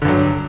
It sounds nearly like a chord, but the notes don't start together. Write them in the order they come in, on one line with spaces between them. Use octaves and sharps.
D3 G2 F#3